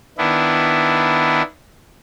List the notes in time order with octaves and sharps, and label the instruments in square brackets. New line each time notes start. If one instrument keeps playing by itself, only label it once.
[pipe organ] D#3 B3 D4 E4